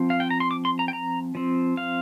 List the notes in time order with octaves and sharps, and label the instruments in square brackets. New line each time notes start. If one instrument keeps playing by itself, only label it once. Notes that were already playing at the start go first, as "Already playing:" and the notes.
Already playing: [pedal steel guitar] F3 C4
F5
G5
A#5
C6
D6
C6
A#5
G5
A#5
F3 C4
F5